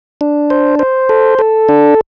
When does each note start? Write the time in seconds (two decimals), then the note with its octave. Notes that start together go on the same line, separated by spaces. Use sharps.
0.21 D4
0.50 C5
0.79 C5
1.09 A4
1.39 A4
1.69 D4